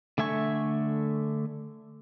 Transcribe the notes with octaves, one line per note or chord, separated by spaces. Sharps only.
D3 A3 E5 G#5 C#6